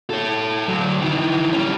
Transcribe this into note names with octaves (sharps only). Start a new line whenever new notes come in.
A4 C#5
D2 F#3
D#3 E3
G3 C#4